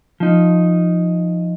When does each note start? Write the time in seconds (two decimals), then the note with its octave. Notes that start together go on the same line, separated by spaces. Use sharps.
0.20 F3 D#4